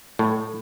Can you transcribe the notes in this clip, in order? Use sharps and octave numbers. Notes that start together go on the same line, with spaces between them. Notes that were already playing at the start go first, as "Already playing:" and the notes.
A2